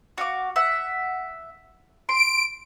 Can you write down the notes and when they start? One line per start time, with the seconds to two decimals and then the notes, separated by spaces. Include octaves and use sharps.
0.18 F#4 F5 D6
0.56 E5 F#5
2.09 C6 D7